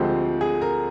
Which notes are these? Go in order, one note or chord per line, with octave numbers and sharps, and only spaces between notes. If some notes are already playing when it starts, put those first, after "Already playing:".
Already playing: D2 D3 F3 G#3 C4 G4
G#4
A#4